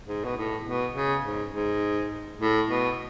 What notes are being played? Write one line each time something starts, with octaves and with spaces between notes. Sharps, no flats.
G#2
B2
A2
B2
C#3
G#2
G#2
A2
B2